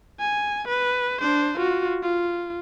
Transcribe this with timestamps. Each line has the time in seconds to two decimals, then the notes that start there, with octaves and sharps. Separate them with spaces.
0.20 G#5
0.68 B4
1.21 D4 C5
1.58 F4 F#4
2.03 F4